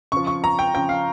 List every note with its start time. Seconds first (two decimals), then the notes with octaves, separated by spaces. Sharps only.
0.12 C#3 F3 C#6
0.27 C#6
0.44 A#5
0.59 G5
0.74 C#3 F3 G5
0.89 F5